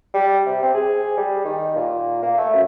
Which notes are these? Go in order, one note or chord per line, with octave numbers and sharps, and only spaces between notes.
G3
C3
C4
G#4
G3
D#3
A#2
A#3
A3
F#2